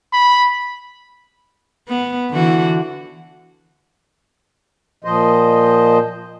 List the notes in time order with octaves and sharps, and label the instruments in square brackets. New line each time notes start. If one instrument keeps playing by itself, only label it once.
[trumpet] B5
[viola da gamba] B3
D3 E3 F#4
[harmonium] A#2 F3 C5 D#5